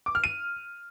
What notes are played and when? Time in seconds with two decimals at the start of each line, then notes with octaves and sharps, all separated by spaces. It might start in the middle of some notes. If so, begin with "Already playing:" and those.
0.06 D6
0.15 F6
0.24 D#7